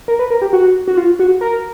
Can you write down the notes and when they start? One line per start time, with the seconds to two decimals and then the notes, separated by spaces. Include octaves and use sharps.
0.08 A#4
0.19 B4
0.30 A#4
0.42 G4
0.53 F#4
0.88 F#4
0.97 F4
1.19 F#4
1.41 A#4